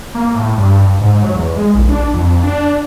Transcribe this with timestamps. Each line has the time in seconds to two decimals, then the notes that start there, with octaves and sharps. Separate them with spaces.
0.15 A#3
0.34 A2
0.58 G2
1.01 G#2
1.23 F#3
1.35 E2
1.57 G#3
1.75 A#1
1.89 D4
2.14 F2
2.43 D4